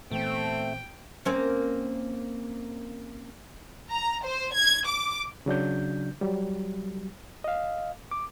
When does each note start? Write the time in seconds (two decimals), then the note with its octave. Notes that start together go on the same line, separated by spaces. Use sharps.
0.11 A#2 E3 A3 B3 C4 G5
1.25 A#3 C4 C#4
3.90 A#5
4.24 C5
4.54 G#6
4.87 D6
5.46 C#3 F#3 D4 G6
6.21 F#3 G3
7.44 D#5 F5
8.11 D6